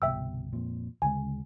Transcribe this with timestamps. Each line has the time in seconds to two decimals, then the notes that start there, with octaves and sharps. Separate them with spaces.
0.02 G1 C2 B2 E5 G5 E6
0.53 F2 A#2
1.02 D2 C#3 G#3 G#5